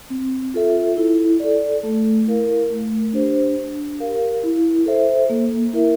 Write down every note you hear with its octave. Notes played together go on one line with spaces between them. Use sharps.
C4
F4 A4 E5
E4
A4 D5
A3
E4 A#4 F5
A3
D4 G4 C5
D4
G4 A#4 F5
E4
A4 C5 E5
A#3
E4 A#4 E5